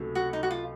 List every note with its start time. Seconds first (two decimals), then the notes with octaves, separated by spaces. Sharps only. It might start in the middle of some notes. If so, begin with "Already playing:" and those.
Already playing: C#2 C3 F#3 A3
0.15 F#4
0.33 D#4
0.43 F#4
0.51 F4